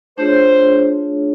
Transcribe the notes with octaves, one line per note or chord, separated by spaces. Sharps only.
A3 D4 F4 G#4 C5 C#5